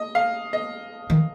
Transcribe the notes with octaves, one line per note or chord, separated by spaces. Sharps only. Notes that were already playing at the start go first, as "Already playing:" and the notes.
Already playing: D#5
F5
D#5
D#3